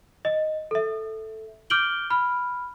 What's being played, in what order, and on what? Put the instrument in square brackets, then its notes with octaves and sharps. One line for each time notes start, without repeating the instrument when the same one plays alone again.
[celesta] D#5
A4 E5
D6 F6 G6 D7 F#7 G7
B5 F6